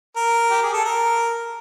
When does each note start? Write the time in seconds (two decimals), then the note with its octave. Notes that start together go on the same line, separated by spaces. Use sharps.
0.16 A#4
0.51 G4
0.63 G#4
0.73 A4
0.84 A#4